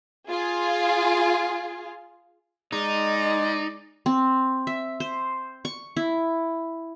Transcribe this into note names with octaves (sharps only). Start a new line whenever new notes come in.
F4 G#4
G#3 D#4 D5
C4
E5
C5
C#6
E4